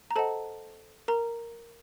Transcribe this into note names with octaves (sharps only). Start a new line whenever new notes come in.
A#5
A4 C5 D#5 F#5 A5
A#4 A#5